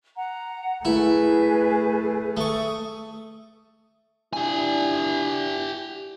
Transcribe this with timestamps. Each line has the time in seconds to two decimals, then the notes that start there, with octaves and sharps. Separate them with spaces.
0.16 F#5 A#5
0.85 A3 E4 G#4 B4
2.37 A3 A4 C#6 D#6
4.33 D4 E4 G4 G#5